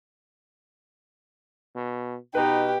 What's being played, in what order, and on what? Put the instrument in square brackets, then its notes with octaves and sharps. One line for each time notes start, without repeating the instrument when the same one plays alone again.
[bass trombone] B2
[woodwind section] B2 [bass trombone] D#4 [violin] G4 [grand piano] B4